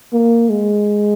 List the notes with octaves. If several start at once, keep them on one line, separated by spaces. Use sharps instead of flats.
A#3
G#3